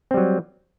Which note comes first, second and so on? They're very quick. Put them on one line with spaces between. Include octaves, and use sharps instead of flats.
C4 G3 F#3